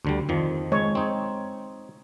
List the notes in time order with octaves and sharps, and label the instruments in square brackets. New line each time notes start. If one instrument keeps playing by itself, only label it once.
[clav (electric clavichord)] D2 D3 G3
F2 D#3 F3
[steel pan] G#3 C#5
[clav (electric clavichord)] C4 D#4